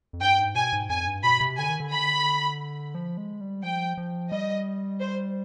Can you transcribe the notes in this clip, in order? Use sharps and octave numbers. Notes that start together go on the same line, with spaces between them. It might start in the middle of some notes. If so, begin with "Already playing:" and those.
F2
G2 G5
G#2
B2 G#5
G#2
F2 G#5
G2
B2 B5
C3
D3 G#5
D#3
D3
B5
F3
G#3
G3
F3 G5
F3
G3 D#5
C5